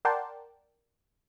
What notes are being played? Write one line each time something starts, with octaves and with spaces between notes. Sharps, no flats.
A#4 D5 F#5 G5 A5 C6